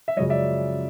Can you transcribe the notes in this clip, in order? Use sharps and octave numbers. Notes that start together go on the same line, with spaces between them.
E5
F#2 C#3 F3 G#3 C#5 D#5
D5 E5